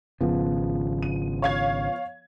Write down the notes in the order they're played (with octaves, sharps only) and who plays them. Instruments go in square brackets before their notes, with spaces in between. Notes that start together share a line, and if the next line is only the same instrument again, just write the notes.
[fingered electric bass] G#1 C#3 [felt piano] F3 B3
[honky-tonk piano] D#7
C#5 F5 G#6